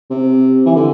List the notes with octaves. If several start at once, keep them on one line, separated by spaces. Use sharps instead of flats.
C3
E3
D3